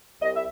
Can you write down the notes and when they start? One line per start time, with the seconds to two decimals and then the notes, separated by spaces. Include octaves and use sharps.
0.22 C2 D#5
0.35 E5